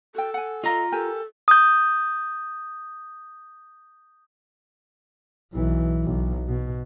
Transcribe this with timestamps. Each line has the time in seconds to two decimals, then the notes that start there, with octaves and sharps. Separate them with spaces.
0.15 F#4 A4 G5
0.34 F#5 G#5
0.64 F4 D#5 F5 A#5
0.92 G4 A4 A#4 G#5
1.48 D#6 G6
5.53 B1 E3
6.04 B1
6.48 B2